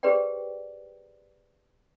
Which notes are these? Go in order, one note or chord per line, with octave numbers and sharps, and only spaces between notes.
G4 G#4 B4 C5 D5 G5